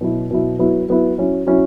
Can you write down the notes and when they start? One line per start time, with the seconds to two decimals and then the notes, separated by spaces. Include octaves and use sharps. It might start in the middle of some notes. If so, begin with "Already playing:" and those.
0.01 B2 F#3 E4
0.31 B2 F#3 E4
0.59 F#3 B3 E4
0.89 F#3 B3 E4
1.18 F#3 C#4 E4
1.47 F#3 C#4 E4